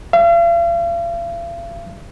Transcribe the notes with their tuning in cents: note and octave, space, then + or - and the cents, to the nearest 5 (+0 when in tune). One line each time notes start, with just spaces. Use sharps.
F5 -40